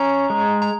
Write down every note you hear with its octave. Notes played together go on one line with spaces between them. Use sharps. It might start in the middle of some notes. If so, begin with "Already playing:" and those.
Already playing: C#4 A#5
G#3
A#5